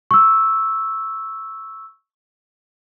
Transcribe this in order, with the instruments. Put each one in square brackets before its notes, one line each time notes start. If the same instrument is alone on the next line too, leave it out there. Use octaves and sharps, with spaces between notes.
[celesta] C#6 E6